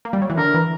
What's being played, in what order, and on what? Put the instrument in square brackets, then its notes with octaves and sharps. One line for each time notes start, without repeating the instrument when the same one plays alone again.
[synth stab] A#3
G3
F#3
E3
[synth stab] D3 [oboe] A#4
[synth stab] E3